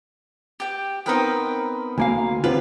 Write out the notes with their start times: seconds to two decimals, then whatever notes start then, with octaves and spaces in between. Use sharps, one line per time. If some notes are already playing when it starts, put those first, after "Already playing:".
0.60 G4 G5
1.06 B3 C4 D#4 A#4 B4 G5
1.98 D2 A#3 F5 G#5 A#5
2.44 D3 G3 C4 F4 B4